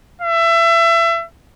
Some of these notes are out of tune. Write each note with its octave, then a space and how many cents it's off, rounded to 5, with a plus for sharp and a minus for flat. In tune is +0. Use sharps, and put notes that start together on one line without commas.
E5 +25